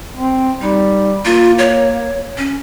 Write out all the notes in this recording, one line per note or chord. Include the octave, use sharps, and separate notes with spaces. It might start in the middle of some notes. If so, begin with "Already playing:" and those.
C4
G3 D#4
A#3 F4
C#5
C#4